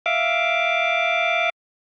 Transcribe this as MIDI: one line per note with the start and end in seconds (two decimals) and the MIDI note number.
0.06 1.50 76
0.06 1.50 77
0.06 1.50 86